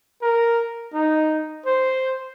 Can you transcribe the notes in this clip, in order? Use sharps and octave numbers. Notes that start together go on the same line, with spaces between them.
A#4
D#4
C5